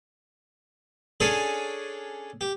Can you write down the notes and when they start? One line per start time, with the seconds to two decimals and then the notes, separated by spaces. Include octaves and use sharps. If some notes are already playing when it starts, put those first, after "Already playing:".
1.20 C#4 D4 G#4 A4 C#5 G#5
2.41 G4